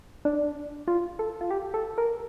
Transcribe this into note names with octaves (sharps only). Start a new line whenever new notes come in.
D4
F4
A4
F4
G4
A4
A#4